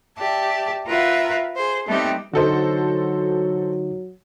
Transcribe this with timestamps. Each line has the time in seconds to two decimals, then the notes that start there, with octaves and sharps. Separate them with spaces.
0.18 G4 D5 E5 A5
0.87 F4 A#4 B4 E5 F#5
1.56 G#4 C5
1.87 G3 A3 B3 C4 D#4 G4
2.33 D3 F#3 D#4 F#4 A4 C5